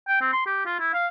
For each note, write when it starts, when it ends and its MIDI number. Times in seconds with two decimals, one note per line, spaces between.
0.08 0.20 79
0.21 0.30 60
0.33 0.43 84
0.46 0.61 67
0.66 0.75 65
0.80 0.90 64
0.93 1.07 77